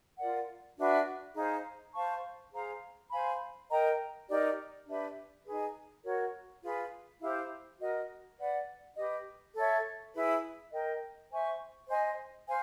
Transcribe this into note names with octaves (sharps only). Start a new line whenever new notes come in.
F4 A#4 D5 F#5
D4 F#4 B4 E5
D#4 G#4 C5 F5
C5 F5 A5 C#6
G#4 C5 F5 A#5
C5 F5 G#5 B5
A#4 D#5 G5 A#5
D#4 G4 A#4 D5
D4 G4 B4 E5
D#4 G#4 B4
F#4 A#4 C#5
F4 G#4 B4
E4 G4 C5 F5
F#4 A#4 D#5
B4 D5 F#5
G4 B4 D#5
A4 C#5 E5
E4 G#4 B4
A#4 D#5 G5
C5 E5 G#5 C#6
C5 D#5 G#5
C5 F5 G#5